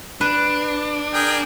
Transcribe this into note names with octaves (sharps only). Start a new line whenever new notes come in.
D4 B4
G#4 A#4 G5